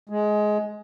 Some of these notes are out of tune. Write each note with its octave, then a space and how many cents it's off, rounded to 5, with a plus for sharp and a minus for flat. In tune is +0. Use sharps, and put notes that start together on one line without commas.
G#3 +15